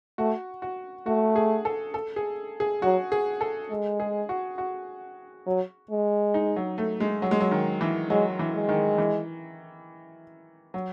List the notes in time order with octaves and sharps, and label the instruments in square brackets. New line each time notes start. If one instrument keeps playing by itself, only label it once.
[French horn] A3 [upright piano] F#4
[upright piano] F#4
[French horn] A3 [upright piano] F#4
[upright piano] G#4
A4
A4
G#4
G#4
[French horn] F#3 [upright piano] F#4
[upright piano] G#4
A4
[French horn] G#3
[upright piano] G#4
F#4
F#4
[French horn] F#3
G#3
[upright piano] D#4
F#3
A3
G#3
F#3
G#3
F#3
D#3
E3
[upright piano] F#3 [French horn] G#3
[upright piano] E3
[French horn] G#3
[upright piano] D#3
E3
F#3